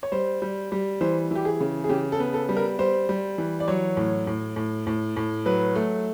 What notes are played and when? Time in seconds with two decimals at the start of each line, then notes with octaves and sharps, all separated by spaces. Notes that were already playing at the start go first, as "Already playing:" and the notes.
0.03 C#5
0.12 G3 C5
0.42 G3
0.72 G3
1.01 E3 C5
1.31 E3 G4
1.45 G#4
1.61 C#3
1.84 G#4
1.89 C#3 G4
2.12 A4
2.20 B3
2.34 A4
2.49 G3
2.57 A#4
2.79 G3 C5
3.09 G3
3.38 E3
3.60 D5
3.68 F#3 C#5
3.97 A2
4.27 A2
4.56 A2
4.86 A2
5.16 A2
5.46 F#3 B4
5.75 A3